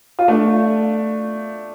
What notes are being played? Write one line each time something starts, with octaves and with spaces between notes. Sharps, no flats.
F4
A3 D4